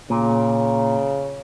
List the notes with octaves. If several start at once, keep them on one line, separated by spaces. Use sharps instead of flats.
A#2 C#3